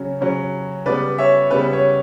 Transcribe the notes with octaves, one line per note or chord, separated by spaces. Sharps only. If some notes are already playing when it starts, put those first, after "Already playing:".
Already playing: C#3 F#3 C#4
C#3 F#3 C#4
C#3 G3 B3 B4 D5
C#5 E5
C#3 G3 B3 B4
C#5